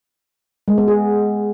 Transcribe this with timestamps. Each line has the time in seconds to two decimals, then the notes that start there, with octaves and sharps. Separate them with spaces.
0.68 G#3
0.78 B3
0.88 G#4